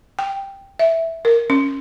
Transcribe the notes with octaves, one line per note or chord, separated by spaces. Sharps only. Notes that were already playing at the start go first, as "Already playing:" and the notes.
G5
E5
A#4
C#4